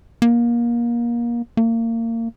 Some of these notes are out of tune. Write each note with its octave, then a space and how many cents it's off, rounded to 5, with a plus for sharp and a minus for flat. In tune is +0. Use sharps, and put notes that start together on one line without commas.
A#3 +25
A#3 -30